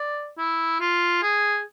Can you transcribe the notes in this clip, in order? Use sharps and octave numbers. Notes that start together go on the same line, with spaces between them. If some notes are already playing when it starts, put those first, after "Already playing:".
Already playing: D5
E4
F4
G#4